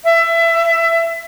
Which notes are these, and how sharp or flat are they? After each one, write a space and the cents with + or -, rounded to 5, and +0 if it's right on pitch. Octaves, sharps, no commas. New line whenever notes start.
E5 +20